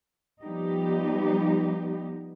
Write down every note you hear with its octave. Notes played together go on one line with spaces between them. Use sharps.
F3 G3 B3 D#4 G4